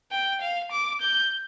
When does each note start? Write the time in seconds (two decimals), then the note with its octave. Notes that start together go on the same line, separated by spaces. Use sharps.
0.12 G5
0.41 F5
0.72 D6
1.01 G6